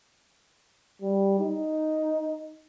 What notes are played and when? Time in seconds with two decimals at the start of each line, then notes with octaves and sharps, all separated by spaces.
1.02 G3
1.39 D#4